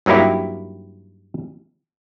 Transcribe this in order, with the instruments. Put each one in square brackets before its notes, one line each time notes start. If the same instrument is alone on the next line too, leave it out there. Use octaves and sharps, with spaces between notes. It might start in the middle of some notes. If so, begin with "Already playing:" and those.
[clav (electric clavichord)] G2 F#3 A#3 D#4 E4 G4